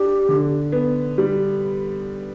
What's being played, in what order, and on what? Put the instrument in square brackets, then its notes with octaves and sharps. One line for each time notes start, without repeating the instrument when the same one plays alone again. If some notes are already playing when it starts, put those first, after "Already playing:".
Already playing: [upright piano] D4 [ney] G4
[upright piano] D3
B3
G3